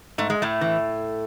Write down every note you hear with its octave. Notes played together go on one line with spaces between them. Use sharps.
G#2 A3
G#3
A2 A3
E3